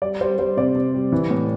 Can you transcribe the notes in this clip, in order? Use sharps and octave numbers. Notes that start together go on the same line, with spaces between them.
G3 D5
G3 C5
G3 C5
C3 D5
C3
G3
E3
A2